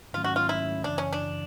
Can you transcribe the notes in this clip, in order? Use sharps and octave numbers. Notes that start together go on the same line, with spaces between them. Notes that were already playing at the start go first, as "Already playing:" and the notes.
G#2 D#3 F#3 A3 C#4 F4
F#4
F4
E4
F#2 C#3 E3 D4
C#4
D4